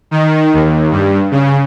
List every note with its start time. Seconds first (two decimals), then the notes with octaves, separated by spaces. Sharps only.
0.11 D#3
0.54 D#2
0.92 G2
1.31 C#3